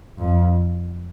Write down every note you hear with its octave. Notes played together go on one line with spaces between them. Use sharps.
F2